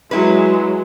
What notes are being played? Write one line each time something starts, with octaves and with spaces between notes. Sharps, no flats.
F#3 G#3 E4 B4